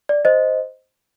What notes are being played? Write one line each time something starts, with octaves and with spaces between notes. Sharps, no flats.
D5
C5 D#5